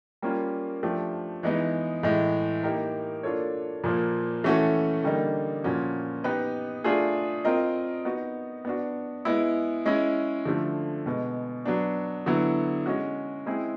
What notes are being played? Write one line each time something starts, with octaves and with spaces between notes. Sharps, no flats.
G3 A#3 C#4 F4 A#4
F3 A3 D4 G4
E3 G#3 B3 D#4
A2 E3 G#3
A#3 D#4 G4 A#4
A#3 D4 F4 A4 C#5
A#2 F3 A#3
E3 A3 C#4 F#4 A4
D3 G3 A#3 D#4
A#2 F3 A#3 C#4 F#4
B3 D#4 G4 B4 D#5
A3 D4 F4 G#4
C4 F4 A#4 D#5
B3 D#4 F#4
B3 D4 F#4
G#3 B3 E4
G#3 C#4 E4
D3 F3 A3
B2 G#3 B3
F#3 B3 D4
D3 F#3 B3 E4
G#3 C#4 F#4
G#3 C4 E4 G#4